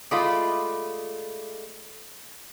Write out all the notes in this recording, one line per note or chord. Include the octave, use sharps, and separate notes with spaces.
G#3 A3 F4 D5 D#5 B5